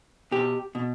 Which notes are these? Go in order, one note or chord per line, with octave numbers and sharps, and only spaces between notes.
B2 G4
B2